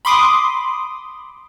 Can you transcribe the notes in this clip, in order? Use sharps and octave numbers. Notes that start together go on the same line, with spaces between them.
B5 C6 D6 D#6